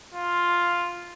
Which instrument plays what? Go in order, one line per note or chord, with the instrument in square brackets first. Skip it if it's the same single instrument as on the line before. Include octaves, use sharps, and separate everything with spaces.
[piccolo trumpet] F4